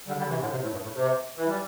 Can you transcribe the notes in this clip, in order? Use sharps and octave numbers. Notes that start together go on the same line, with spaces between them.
D3 G3
D3 G3
C3 E3
A2 D3
C3
A2
G2
A2
C3
E3
G3